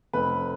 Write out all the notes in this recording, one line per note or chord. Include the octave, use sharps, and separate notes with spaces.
F1 B4